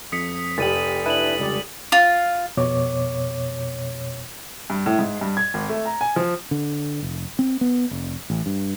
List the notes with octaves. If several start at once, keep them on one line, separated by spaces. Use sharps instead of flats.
F2 D#6 B6 C#7
F1 G4 A6 D#7 F#7
D4 E4 B4 D#7 E7 F#7
C#2 G3 D5
F4
F2 B2 C#5 D6
G2
A2
G#2
G2
G#6
G#1
A3
A#5
G#5
F3
D3
F1
C4
B3
F1
A1
G2